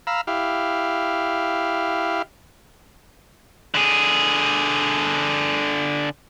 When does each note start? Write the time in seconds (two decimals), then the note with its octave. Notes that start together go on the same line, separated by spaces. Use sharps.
0.07 F5 A#5 B5 E6
0.27 E4 G4 F5
3.75 D3 G#4